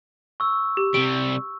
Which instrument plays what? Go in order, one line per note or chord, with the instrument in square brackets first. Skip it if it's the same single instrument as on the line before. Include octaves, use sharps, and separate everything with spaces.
[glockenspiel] C#6 E6
[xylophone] G4
[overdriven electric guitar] C3 G3 [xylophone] D7